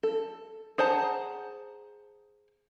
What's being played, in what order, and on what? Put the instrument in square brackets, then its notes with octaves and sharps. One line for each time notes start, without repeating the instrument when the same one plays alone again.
[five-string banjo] A4
G#4 C5 F#5 A5 A#5